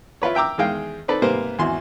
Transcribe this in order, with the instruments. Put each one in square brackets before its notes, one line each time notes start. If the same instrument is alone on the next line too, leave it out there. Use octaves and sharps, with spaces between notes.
[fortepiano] E4 F4 B4 C#5
E5 G5 A#5 D6 E6
E2 D#3 G#3 F5 G5
C4 D#4 A4 B4 D5
G#2 C3 G3 A#3 B3 C5
G#1 E2 F#4 C6